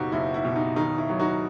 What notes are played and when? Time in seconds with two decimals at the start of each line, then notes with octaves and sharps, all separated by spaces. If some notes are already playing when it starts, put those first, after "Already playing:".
Already playing: F#1 B2 D#4 F#4 G4
0.12 F#1 E4
0.34 E4
0.45 B2
0.56 D#4
0.76 D#3 D#4
0.98 E4
1.09 F#3
1.19 D#4 F#4